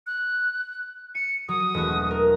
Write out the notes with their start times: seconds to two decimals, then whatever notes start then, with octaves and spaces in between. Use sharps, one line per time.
0.07 F#6
1.15 C#7 D#7
1.49 F#3 D#6
1.74 E1 A3 F#4
2.11 A#4